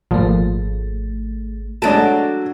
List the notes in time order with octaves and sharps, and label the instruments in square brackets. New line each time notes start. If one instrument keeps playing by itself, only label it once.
[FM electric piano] G#1 A3 [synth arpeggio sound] A#2 F3
[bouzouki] F#3 A5 [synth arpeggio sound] G#3 D7 [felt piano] A3 D4